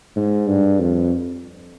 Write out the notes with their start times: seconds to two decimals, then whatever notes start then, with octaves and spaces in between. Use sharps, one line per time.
0.16 G#2
0.47 G2
0.79 F2